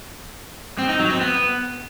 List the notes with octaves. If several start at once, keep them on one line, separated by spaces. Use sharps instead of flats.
C4
D#4
F#3
C4
B3